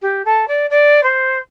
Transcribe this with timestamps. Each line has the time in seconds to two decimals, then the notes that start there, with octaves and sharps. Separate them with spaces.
0.01 G4
0.25 A4
0.47 D5
0.70 D5
1.03 C5